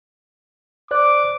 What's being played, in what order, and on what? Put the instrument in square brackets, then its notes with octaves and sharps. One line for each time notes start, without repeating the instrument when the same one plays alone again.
[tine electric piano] C5 D5 F#6 [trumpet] D6